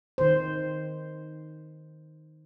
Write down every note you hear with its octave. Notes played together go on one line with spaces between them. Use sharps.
D#3 C5